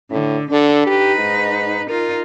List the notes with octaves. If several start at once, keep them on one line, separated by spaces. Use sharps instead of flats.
A2 D3
D3 D4 A4
D#4 G4 B4
G#2
D#4 F4 A#4